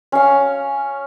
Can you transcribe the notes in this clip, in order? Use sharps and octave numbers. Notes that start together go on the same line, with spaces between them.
C#4 F5